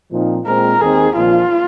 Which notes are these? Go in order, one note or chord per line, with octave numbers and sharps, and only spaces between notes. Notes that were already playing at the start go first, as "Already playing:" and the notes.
A#2 F3 C4 D#4
A#2 G#3 C4 A#4
D#2 D#3 C4 D#4 G#4
A#1 A#2 F3 F4